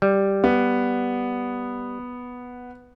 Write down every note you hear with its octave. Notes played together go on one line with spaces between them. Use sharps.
G3
B3